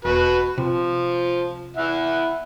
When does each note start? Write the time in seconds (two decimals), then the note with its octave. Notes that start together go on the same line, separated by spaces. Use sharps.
0.05 E1 F#4 B4
0.58 C3 F3
1.77 E4 E5 F#5